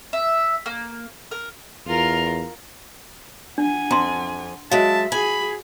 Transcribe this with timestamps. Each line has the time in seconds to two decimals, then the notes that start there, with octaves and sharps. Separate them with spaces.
0.13 E5
0.66 A#3
1.31 A#4
1.87 E2 F4 A#4
3.58 D4 F#5 G#5
3.91 F2 A#5 C6
4.71 F#3 G#3 E5 F5 A5
5.12 F#4 G#4 G#5 B5